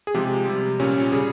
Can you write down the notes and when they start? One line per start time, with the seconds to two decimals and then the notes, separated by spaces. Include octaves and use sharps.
0.07 G#4
0.14 C3 F3 G#3 G4
0.46 C3 G3
0.80 A#2 G3 C#4
1.12 C#3 G3 G#4